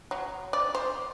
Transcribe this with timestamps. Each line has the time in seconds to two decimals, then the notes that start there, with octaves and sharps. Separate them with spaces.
0.11 F#3
0.53 D5
0.75 C5